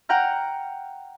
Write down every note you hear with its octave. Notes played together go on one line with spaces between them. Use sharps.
F#5 G5 A#5 F6